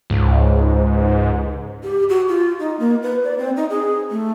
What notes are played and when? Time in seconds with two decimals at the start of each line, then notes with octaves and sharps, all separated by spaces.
0.10 C#2 G#2
1.83 G4
2.09 F#4
2.28 F4
2.60 D#4
2.80 A#3
3.03 B4
3.24 D5
3.39 C4
3.56 D#4
3.70 G#4
4.11 A3